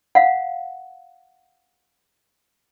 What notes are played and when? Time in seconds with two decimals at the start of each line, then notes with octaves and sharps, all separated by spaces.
0.15 F5 F#5